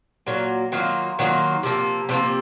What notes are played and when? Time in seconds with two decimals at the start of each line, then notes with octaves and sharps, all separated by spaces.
0.27 A#2 F#3 A#3
0.72 D#3 F#3 A#3 F4
1.19 D#3 F#3 A#3 F4
1.63 C3 F3 A#3
2.09 C3 F3 A#3